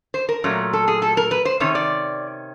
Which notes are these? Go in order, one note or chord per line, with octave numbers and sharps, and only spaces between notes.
C5
A#4
A#2 F#3 A3 C#4
A4
G#4
A4
A#4
B4
C5
C3 D#3 C#4 C#5
D5